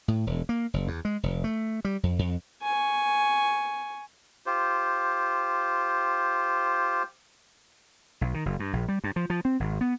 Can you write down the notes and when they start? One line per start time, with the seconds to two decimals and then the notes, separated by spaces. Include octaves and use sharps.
0.08 A2
0.27 E1
0.49 A#3
0.74 F#1
0.88 E2
1.05 G#3
1.23 F1
1.44 A3
1.85 G3
2.03 F2
2.19 F2
2.63 G#5 C#6
4.46 F4 G4 C5
8.21 B1
8.34 D#3
8.46 F#1
8.60 G2
8.73 A#1
8.88 G3
9.04 G2
9.16 F3
9.30 F3
9.45 C4
9.60 G#1
9.81 B3